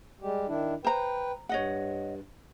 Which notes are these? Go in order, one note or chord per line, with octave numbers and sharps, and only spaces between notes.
G3 G#3 G4
D#3 D4 E4
B4 C5 G5 A#5
G2 C#5 D#5 F#5